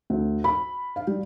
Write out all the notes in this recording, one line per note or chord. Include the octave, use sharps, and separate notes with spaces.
D2
B5
F5
G3